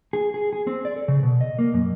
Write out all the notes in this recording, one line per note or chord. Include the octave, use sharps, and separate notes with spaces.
G#4
G#4
G#4
C4
D5
A4
C#3
B2
D#5
A#3
F#2